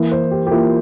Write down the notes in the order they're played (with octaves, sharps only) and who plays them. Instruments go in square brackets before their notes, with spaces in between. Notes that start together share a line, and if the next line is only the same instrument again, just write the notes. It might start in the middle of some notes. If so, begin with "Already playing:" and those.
Already playing: [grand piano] E3 A#3 E4
C5
G4
G4
E3 A#3 E4 F4